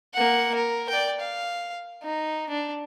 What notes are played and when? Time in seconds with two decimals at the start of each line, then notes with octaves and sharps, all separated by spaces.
0.14 A#3 F#5
0.55 A#4
0.89 D5 G5
1.20 F5
2.03 D#4
2.50 D4